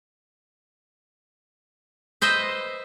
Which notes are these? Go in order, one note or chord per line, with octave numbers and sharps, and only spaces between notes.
B4 C5 D#5 E5